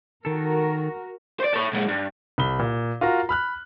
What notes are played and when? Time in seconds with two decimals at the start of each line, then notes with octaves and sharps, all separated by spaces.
0.25 D#3 F#4 A4 A#4
1.40 C5 D5
1.54 A4 C#5
1.73 A#2 G#3
1.89 G2
2.38 C2 B5 G7
2.59 A#2
3.01 F4 F#4 A#4 A#5
3.29 B5 F6 F#6